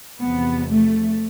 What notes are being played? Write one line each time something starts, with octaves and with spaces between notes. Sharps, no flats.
E2 C3 F3 B3
A3